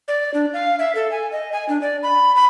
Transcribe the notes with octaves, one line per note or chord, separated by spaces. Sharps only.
D5
D4
F5
E5
A4
G#5
D#5
G#5
D4
D5
B5
B5